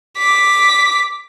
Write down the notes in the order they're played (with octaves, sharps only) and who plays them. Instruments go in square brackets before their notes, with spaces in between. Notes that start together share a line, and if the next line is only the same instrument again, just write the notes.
[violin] D6 B6